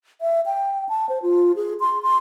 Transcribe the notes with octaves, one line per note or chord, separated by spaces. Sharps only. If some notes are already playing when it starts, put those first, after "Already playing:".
E5
G5
A5
C5
F4
G#4
C6
C6